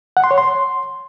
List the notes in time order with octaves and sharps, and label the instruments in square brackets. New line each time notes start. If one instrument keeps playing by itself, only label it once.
[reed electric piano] F#5
C6
C#5
C6